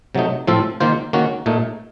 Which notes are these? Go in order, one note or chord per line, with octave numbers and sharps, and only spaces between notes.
C3 F#3 A3 D#4
A2 F3 C4 F4 A4
D#3 A#3 F4 C5
D#3 A#3 C#4 F#4
A#2 A3 D#4